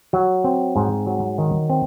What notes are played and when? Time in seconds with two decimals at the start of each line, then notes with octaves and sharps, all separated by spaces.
0.13 F#3
0.44 C4
0.76 G#2
1.07 F#3
1.38 D#3
1.69 C4